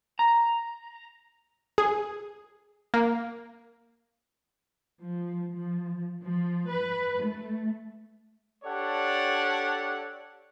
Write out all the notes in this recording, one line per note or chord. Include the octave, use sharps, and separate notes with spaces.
A#5
G#4
A#3
F3
F3
F3
B4
A3
D4 G4 A4 C#5 D5 F#5